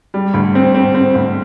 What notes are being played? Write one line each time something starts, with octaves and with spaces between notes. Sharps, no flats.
G3
D2
C4
C4
C4
D2